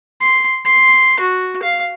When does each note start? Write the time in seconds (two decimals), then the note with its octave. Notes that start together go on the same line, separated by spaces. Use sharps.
0.20 C6
0.65 C6
1.20 F#4
1.63 F5